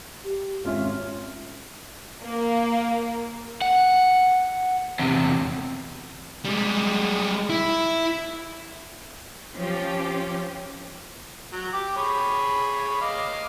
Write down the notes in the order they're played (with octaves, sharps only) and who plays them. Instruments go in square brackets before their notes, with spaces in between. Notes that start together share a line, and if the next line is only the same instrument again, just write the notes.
[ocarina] G4
[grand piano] G#1 C#4 E5 [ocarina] C4 [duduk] F4
[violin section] A#3
[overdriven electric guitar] F#5
E2 C3
[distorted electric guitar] G3 G#3
E4
[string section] F3 C#4 F4 G4
[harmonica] F#3
G4 D6
G#4 C#5 B5
D#5 F5 D6